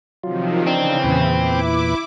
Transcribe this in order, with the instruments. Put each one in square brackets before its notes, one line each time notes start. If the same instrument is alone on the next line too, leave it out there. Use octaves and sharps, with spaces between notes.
[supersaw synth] C3 D#3 F3 [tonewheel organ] F#3 F4
[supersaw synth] C#3 E3 [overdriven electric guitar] C4 [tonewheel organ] D4 D#4
[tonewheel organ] E2 A#2 B4
[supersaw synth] E4 D6